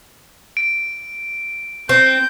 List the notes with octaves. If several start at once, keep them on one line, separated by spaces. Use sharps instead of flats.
D7
C4 G6